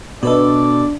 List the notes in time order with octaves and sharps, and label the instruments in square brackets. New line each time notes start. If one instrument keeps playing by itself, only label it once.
[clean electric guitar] B2 A4 [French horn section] D4 [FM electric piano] F#4 B4 D#5 [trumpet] D5